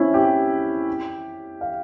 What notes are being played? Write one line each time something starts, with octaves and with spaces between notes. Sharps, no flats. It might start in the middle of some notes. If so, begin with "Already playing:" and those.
Already playing: C4 C#4 E4
G4
F5